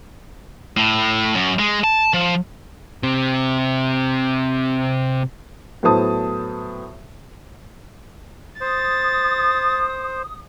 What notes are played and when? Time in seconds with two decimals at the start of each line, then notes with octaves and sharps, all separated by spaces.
0.77 A2
1.34 F#2
1.59 G#3
1.84 A5
2.14 F3
3.03 C3 C4
5.83 A2 F#3 B3 C5 A5 D#6
8.61 C5 D#6 A6